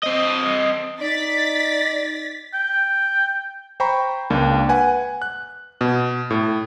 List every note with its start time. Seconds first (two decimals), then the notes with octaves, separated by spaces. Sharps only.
0.03 C4 D#5
1.01 D#4 D5 A6 B6
2.54 G5
3.80 C5 G5 A#5 B5 C#6
4.30 C#2 A#3 D4
4.69 B4 F#5 G#5
5.22 F#6
5.81 B2
6.30 A2